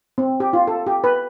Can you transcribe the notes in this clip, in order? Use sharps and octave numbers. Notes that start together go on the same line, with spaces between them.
C4
G4
F4
A4
G4
B4